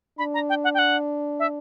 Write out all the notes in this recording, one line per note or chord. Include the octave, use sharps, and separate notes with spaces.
D4 B5
A#5
G5
F#5
G5
F#5
E5